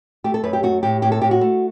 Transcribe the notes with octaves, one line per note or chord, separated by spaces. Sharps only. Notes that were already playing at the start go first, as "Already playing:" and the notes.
A3 G4
A4
F#2 B4
G4
A3 F#4
A2 G4
A2 G4
A4
A2 G4
F#4
A3